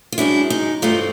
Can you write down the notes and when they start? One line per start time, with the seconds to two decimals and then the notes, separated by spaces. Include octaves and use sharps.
0.12 F4
0.18 F#2 D#3 G#3 D4 E4
0.50 D#4
0.82 G2 E3 A3 C4 D#4 F4